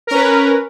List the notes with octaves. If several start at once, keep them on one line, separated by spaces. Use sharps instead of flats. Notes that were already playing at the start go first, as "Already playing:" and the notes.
C#4 A#4 B4